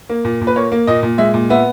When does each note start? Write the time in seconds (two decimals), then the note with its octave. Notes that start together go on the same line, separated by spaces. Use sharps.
0.10 A#3
0.25 A#2
0.41 A#2
0.47 B4
0.56 A#3 C#5
0.72 A#3
0.87 A#2 D#5
1.03 A#2
1.18 G#3 E5
1.34 A#2
1.50 B3 E5